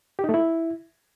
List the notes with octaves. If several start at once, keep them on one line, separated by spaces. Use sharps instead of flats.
G4
D#4
A3
E4